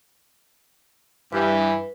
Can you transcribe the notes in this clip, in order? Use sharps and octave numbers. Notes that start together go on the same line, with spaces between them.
G2 E3 B4